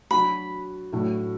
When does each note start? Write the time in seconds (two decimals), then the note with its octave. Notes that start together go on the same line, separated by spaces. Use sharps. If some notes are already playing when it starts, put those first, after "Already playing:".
0.11 F#3 D4 F#4 B5
0.92 A2 F#3 A3 D4